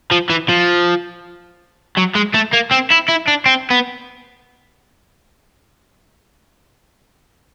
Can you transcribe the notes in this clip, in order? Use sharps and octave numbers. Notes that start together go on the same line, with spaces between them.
F3
E3
F3
F#3
G#3
A3
A#3
C4
E4
E4
D4
C4
B3